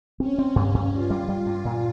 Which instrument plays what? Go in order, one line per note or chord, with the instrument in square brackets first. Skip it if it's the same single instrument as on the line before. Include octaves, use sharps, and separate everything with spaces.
[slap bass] C4 [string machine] C#4
[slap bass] C4
G2
G2
[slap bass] G2 [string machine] F4
[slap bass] G3
G3
G2
A#2